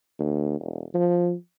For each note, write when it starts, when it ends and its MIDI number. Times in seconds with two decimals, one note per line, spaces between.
0.19 0.58 38
0.60 0.85 28
0.95 1.33 53